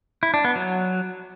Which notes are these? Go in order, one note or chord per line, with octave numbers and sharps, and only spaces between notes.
E4
D4
B3
F#3